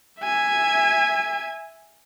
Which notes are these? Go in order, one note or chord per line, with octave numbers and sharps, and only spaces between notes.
E5 G#5